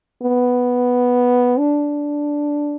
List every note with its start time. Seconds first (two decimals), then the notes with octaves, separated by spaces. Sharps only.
0.22 B3
1.59 D4